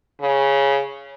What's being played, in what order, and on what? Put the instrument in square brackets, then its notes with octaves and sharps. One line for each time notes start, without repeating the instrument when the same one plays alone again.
[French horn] C#3